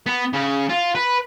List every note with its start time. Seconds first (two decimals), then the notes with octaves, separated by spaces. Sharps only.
0.06 B3
0.33 C#3
0.69 F4
0.95 B4